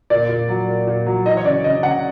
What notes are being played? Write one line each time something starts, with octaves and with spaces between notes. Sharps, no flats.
A#2 D5
A#2
F#3
A#2
A#2
F#3
E3 D#5
C#5
C#3 D5
C#3 D#5
C#3 F#5